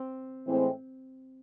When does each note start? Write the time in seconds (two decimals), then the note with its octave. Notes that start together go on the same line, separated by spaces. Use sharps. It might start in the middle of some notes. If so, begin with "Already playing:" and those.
Already playing: C4
0.46 A2 E3 G#3 C4